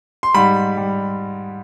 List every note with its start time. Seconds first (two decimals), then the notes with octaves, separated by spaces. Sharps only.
0.23 C6
0.35 G#2 G3 B5
0.77 G3